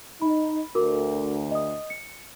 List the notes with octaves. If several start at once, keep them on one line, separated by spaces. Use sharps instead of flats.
D#4 B5
D2 D3 F#4 A#4 D6
D#5 D#6
C#7